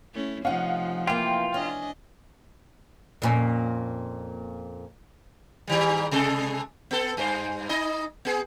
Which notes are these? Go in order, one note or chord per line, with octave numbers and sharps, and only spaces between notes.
A3 C#4 E4
C3 F3 A3 C#4 D#4 F5 F#5
E3 A#3 F4 G5
C#4 D4 D#5
F2 A#2 C#4
G#2 D#3 G3
C3 G#3 A4
B3 A4
G2 C5
D#4 D#5
B3 G#4